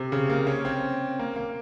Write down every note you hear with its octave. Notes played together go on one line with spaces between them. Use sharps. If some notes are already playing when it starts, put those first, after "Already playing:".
Already playing: C3
C#3
A#3
C#4
C4
A#3
A#3